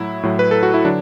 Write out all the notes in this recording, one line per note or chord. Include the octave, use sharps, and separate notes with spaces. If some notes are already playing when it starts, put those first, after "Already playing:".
Already playing: A2 F#3 E4
A2 F#3
B4
A4
F#4
E4
D3 F#3 D4